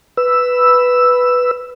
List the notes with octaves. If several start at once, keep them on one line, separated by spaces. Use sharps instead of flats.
B4 E6